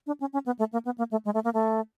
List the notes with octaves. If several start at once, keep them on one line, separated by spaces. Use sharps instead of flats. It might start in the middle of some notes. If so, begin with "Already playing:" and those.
D4
C#4
C#4
B3
A3
A#3
B3
A#3
A3
G#3
A3
A#3
A3